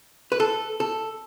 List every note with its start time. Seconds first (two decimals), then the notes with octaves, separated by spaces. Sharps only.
0.32 B4
0.40 A4
0.80 A4